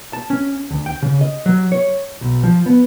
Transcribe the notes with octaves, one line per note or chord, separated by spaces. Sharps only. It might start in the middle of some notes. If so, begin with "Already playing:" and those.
A5
C#4
D2
G5
C#3
D#5
F#3
C#5
B1
F3
B3